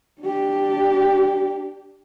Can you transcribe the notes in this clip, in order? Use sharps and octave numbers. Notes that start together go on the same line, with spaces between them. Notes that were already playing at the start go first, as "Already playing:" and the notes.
D4 G4